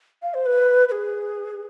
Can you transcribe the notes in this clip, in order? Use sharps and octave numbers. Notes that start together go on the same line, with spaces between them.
F5
C5
B4
B4
G#4